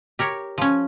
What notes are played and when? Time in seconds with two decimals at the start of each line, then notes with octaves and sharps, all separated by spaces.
0.19 G4 A#4 C#5
0.58 F3 C#4